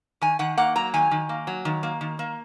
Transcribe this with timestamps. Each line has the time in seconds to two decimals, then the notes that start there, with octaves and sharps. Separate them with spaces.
0.21 D#3 G#5
0.39 D#3 F#5
0.57 A#3 F#5
0.76 F#3 A#5
0.94 D#3 G#5
1.11 D#3
1.29 A#3
1.47 F#3
1.65 D#3
1.83 A#3
2.01 D#3
2.19 A#3